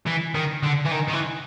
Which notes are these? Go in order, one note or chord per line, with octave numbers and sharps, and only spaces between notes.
E3
D#3
D3
E3
D#3
D#3
E3